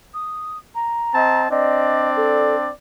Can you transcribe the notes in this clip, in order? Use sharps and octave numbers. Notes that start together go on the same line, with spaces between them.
D#6
A#5
C4 D#5 A5
C4 D4 D5 D#5
A4